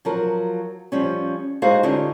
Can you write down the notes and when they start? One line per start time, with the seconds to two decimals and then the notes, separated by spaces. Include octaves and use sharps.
0.05 F3 F#3 A#4
0.92 F3 G3 C#4
1.62 G#3 D#4 F#4 G#4 C5 F5
1.83 D3 C#4 D#4 F4 G4